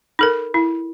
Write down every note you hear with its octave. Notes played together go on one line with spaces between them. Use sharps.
D#4 A4 A#4
E4